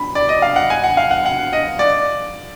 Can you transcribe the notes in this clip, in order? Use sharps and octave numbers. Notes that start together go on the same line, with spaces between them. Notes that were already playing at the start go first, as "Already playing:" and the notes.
Already playing: B5
D5
D#5
F5
F#5
G#5
F#5
F5
F#5
F#5
D#5
D5